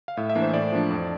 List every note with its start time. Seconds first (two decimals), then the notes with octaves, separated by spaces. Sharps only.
0.08 F5
0.17 A2 E5
0.29 E5
0.35 E3 A#3 D4
0.42 C5
0.53 A2 D5
0.72 F3 A#3 D4
0.91 F2